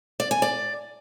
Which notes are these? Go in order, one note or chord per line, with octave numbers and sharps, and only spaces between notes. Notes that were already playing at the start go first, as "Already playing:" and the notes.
D5
G#5
D5